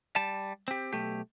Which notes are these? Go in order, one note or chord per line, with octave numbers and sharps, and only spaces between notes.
G3 A5
C4 G4
B1 A3 G4